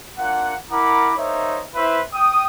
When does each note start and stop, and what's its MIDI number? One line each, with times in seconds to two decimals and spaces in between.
0.18 0.53 58
0.18 0.53 62
0.18 0.53 65
0.18 0.53 78
0.70 1.12 64
0.70 1.12 70
0.70 1.12 78
0.70 1.12 82
0.70 1.12 83
0.70 1.12 86
1.16 1.61 58
1.16 1.61 63
1.16 1.61 72
1.16 1.61 73
1.16 1.61 76
1.75 1.99 64
1.75 1.99 71
1.75 1.99 72
1.75 1.99 76
2.13 2.45 79
2.13 2.45 87